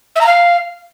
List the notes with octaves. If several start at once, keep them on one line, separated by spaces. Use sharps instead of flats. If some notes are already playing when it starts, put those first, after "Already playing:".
E5
A#5
F5